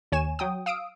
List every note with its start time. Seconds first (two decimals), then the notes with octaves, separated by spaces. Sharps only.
0.12 D#2 C#5 G#5 E7
0.39 F#3 G5 D#6
0.66 F5 D#6 E6 D7